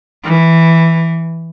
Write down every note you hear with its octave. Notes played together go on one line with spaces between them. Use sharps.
E3